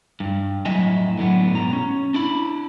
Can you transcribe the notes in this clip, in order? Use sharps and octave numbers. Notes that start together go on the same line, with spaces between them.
G2
F2 A2 F#3 D#5 E5 G#5
A2 D3 F#3 B3
G#2 B2 A#5
C#4
D4 E4 B5